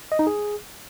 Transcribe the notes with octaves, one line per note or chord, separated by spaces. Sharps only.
D#5
D#4
G#4